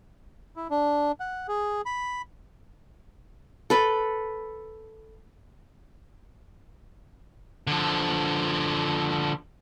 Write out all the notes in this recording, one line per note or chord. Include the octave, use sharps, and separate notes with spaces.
E4
D4
F#5
G#4
B5
A4 B4
D3 F3